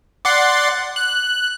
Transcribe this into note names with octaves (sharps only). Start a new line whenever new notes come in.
D5 F#5 C6
F#6